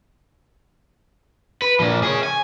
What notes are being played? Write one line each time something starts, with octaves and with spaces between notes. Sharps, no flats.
B4
A#2 F3
G#4 C#5
G#5